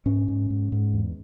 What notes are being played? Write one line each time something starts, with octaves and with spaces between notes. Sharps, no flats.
G#2 C#4
G#2
G#2
G#2
E2